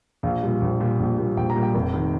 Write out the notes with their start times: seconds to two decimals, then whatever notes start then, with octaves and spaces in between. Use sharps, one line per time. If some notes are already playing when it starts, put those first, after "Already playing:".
0.23 A#1 F5
0.42 A#2 G3
0.62 A#1
0.80 A#2 G3
0.99 A#1
1.18 A#2 G3
1.37 A#1 G5
1.50 A#5
1.55 A#2 G3
1.63 G5
1.75 F1
1.94 D#3